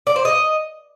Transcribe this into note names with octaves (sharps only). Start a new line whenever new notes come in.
D5
C5
D#5